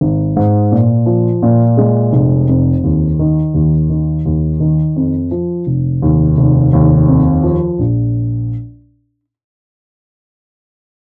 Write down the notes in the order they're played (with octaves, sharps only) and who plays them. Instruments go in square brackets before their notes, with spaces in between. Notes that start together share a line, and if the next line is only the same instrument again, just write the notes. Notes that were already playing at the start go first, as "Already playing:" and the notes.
[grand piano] G#1
G#2
A#2
F3
A#2
G#3
F1
F2
D#2
D#3
D#2
D#3
D#2
D#3
F2
F3
F1
D#2
F1
D#2
F2
F3
A#1